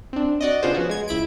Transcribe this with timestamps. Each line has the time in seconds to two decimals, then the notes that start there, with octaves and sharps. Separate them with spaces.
0.13 C4 D4
0.41 F#4 D5 D#5
0.63 C#3 B3 D4 F4 G#4 C5
0.74 F3 B3 C#4 F#4
0.89 G#3 G#6
1.08 C#2 E4 B5 D7